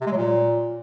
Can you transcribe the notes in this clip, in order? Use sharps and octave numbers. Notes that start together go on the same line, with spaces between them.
C3
G#3
F#3
A#2